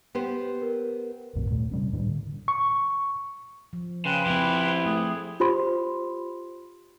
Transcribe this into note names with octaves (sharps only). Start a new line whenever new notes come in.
B3 G4 C5
A#4
A#1 E2 G#2 B2
D#2 A#2 A3
C3 G3 C#4
A2 D#3 G3 D4
D3
C#6
F3
C#3 B4 G5 C6
F3 C4 E4 G4
A3 G#4
F4 G4 C5 B5 C6